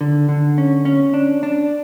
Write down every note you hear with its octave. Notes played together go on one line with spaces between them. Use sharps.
D3
D3
C#4
C#4
D4
D4